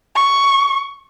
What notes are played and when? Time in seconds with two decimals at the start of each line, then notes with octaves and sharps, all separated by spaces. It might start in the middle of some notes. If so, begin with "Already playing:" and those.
0.15 C#6